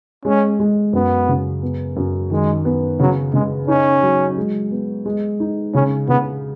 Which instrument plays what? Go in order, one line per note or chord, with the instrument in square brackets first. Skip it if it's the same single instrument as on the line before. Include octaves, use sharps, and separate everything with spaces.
[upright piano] G#3 [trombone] C#4
[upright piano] G#3
[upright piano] F#2 [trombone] B3
[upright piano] C#3
B3
F#2
[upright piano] D#3 [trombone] G#3
[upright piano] B3
[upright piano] C#3 [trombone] F#3
[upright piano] C#3 [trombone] G#3
[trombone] C#4 [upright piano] D#4
[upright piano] F#3
G#3
B3
G#3
D#4
[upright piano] C#3 [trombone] C#4
[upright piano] C#3 [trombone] B3